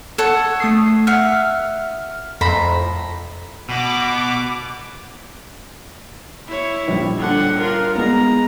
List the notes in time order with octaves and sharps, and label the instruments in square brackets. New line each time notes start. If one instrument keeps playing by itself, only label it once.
[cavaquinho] A4 C#5 F#5
[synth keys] A3 D#6 C7
[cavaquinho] E5 F#5 [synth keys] F6
[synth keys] F2 A2 [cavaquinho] C5 A#5 B5
[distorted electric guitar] B2 F#4 [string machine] D6
[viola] E4 C#5
[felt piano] A#1 G3
[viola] D3 F#5
F4 A#4
[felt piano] G#3 B3 [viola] A#5